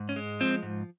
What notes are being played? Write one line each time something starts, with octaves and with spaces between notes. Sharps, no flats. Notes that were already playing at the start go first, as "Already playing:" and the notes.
Already playing: G#2
C#4
G#3
F3 C4
G#2